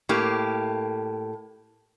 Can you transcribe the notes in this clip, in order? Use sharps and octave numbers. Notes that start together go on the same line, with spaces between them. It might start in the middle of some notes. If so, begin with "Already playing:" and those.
A2 A#3 G4